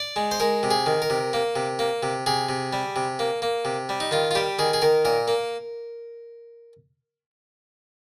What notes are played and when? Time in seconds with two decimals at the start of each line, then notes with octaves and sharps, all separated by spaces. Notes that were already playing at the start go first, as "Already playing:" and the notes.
Already playing: D5
0.16 G#3
0.31 C5
0.40 G#3 A#4
0.63 C3
0.71 G#4
0.86 D#3
1.02 A#4
1.10 C3
1.33 A#3
1.56 C3
1.79 A#3
2.03 C3
2.26 C3 G#4
2.49 C3
2.73 G3
2.96 C3
3.19 A#3
3.42 A#3
3.65 C3
3.89 G3
4.00 D#4
4.11 D#3 F4
4.31 F4
4.35 G3 G4
4.59 D#3 G#4
4.73 G#4
4.82 D#3 A#4
5.05 A#2 A#4
5.28 A#3